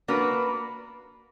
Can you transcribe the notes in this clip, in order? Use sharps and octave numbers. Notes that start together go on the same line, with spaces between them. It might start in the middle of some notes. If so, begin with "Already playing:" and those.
A#3 D4 F#4 B4